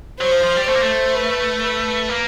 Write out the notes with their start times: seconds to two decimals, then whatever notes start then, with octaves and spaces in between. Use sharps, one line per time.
0.21 F#3 C5
0.32 F3
0.44 F3
0.56 G3
0.68 A3 C5
0.75 A#3
0.83 A3
1.15 B4
1.63 B4
2.10 A#3